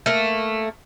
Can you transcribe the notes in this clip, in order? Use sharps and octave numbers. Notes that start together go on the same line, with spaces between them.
A3 A#3